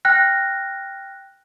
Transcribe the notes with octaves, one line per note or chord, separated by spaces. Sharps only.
G5 F6 F#6 A#6